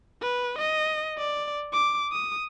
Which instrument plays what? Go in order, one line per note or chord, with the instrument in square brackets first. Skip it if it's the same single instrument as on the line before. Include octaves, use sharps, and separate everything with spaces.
[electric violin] B4
D#5
D5
D6
D#6